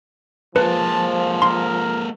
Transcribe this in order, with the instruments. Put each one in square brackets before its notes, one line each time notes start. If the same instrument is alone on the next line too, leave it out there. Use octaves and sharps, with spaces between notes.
[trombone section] F3 [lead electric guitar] G#3 A#3 [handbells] B4 [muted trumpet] A5
[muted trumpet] A#4 [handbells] C6